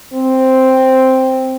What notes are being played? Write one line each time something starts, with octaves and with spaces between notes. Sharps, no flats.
C4